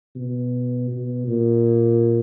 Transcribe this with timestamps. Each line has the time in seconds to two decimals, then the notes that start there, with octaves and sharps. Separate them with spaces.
0.16 B2
0.91 B2
1.28 A#2